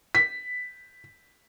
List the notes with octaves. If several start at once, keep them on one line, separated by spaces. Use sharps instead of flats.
B6